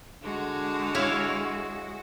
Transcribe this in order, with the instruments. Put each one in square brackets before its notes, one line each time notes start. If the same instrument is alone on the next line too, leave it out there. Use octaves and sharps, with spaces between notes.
[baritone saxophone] D3 [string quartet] G#3 F#4
[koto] E4 C#5 F5